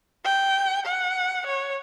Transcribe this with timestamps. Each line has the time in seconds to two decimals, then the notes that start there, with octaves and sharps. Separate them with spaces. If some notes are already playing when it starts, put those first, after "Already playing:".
0.25 G5
0.86 F#5
1.47 C#5